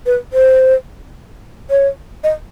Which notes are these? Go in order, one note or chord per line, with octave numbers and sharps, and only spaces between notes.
B4
C5
C#5
D#5